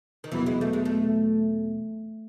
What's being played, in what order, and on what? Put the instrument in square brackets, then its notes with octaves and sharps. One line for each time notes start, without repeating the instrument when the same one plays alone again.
[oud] D#3
[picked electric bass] E2 B2 F#3 B3 [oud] E3
[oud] G#3
A3
G#3
A3